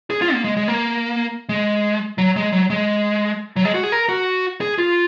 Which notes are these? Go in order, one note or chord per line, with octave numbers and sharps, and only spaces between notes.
G#4
F4
A#3
G#3
G#3
A#3
G#3
F#3
G#3
F#3
G#3
F#3
G#3
F#4
G#4
A#4
F#4
G#4
F4